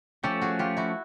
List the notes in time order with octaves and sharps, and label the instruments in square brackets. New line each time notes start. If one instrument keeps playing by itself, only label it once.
[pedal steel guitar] F3 A3 C#4 [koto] G4 A4
[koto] F#4 G#4
F4 G4
E4 F#4